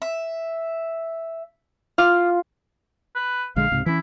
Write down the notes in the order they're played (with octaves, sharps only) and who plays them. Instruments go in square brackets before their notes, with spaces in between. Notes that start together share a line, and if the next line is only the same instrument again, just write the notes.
[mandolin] E5
[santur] F4 [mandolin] D6 F6
[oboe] B4
[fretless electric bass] A#1 D3 G#3 [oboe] F5
[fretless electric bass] C#2 G#2 C3
[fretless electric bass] E3 C#4 [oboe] E4